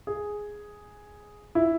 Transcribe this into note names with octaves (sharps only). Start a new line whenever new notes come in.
G#4
E4